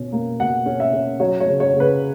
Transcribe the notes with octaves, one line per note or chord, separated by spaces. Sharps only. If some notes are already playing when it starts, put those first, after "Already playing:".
Already playing: B2 C#4
A#3
B2 F#5
C#4
E5
C#4
F#3 C#5
C#5
C#3
C#5
C#3
B4